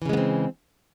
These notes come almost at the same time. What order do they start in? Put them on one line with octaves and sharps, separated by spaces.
E3 C#3 G#3 B3 C4